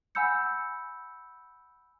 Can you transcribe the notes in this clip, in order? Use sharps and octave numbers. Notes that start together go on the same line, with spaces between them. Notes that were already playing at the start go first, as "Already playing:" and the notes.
F#5 G#5 B5 E6 G6 C#7